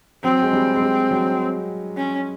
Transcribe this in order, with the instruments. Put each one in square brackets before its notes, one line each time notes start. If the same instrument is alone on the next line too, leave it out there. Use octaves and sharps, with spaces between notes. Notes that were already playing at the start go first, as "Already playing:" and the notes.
[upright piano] F#3 [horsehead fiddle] C4
[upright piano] G#3
G3
G#3
G3
F#3
[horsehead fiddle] C#4